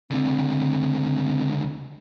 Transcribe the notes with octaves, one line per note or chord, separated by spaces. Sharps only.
C#2 D3 C4